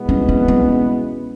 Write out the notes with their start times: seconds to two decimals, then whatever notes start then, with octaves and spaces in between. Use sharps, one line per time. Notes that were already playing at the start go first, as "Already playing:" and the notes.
Already playing: B2 G#3 B3 E4
0.09 C#4
0.29 C#4
0.48 C#4